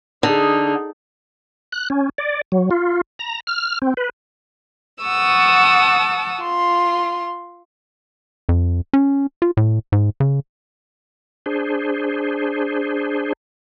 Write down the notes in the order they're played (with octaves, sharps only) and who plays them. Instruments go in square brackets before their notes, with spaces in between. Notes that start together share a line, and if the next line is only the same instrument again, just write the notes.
[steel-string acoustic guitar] D3 [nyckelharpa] D#4 G#4
[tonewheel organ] F#6
C#4
D5
F#3
F4
A#5
F6
C4
B4
[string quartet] F#5 A5 C#6 D#6 E6
F4 C6
[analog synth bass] F2
C#4
F4
A2
G#2
C#3
[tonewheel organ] D4 G#4 C5